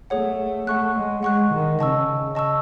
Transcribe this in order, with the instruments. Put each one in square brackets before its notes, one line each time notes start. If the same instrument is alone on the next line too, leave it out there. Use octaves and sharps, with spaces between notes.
[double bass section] A3 [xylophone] G#4 C#5 F#5
[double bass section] A3 [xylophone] F#5 C#6 F#6
[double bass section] G#3
[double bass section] G#3 [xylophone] F#5 C#6 F#6
[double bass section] D#3
[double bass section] C#3 [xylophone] D#5 A5 C#6 E6
[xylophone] D#5 A5 C#6 E6